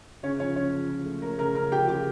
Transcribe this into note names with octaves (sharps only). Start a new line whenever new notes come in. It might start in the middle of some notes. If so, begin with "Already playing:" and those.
C#3 C#4 C#5
F3 C#4 C#5
F3 C#4 C#5
F3
F3
A3
A3 A#4
C#3 A#4
C#3 A#4
F3 G4 G5
C#3 G4 G5